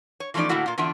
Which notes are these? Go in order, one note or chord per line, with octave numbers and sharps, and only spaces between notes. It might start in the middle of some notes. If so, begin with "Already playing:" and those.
C#5
E3 F3 A3 C#4 D#4 D5
A2 D3 A3 A#3 E4 F#4
A#2 F4
E2 D3 D4 F4 E5